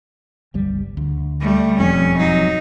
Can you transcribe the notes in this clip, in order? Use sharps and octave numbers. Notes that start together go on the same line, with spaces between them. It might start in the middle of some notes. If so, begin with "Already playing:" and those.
G1 C#2 G3
D2
G3 A3
E1 F2 G#2 C#4
F#3 D#4